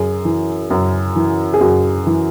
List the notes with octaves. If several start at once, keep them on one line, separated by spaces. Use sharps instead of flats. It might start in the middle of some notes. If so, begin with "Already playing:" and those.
Already playing: F#2 G#4
E3
F#2
E3
G#4
F#2 F#4
E3